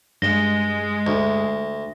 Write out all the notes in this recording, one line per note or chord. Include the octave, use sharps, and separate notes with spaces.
G2 G#3 A#6 G7
D2